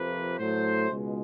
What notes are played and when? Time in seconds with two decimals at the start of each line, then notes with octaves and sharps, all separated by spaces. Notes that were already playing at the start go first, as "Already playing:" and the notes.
Already playing: F2 C3 F3 A#3 B4
0.38 A2 F#3 A3 C5
0.90 C#2 B2 G#3